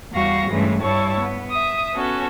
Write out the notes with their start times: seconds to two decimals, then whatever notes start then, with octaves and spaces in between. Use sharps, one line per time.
0.13 E2 G3 F#4 F5 C#6 A#6
0.49 G2 E3 G#3 A3 C#4
0.81 G2 G3 E4 C#5 A5 C#6
1.20 B3
1.50 E5 D#6
1.94 B3 C#4 F#4 A4